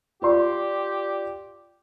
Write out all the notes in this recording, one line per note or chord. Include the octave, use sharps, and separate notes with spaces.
F4 G4 D5 C6